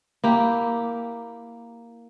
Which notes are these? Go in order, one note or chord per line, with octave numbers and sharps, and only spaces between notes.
A#3 E4 G4